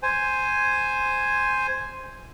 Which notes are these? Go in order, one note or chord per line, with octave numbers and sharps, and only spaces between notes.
C5 G#5